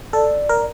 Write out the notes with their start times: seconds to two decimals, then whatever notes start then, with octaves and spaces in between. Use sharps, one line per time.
0.13 A4 D5
0.49 A#4